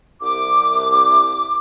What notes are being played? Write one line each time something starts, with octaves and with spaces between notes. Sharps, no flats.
C2 D6